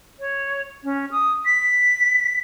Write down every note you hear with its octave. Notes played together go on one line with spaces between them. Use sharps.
C#5
C#4
D#6
B6